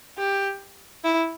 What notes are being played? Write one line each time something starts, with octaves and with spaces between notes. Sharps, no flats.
G4
E4